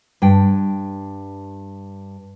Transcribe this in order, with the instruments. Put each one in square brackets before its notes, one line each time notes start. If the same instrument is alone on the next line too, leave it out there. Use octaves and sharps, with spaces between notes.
[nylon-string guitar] G2 G5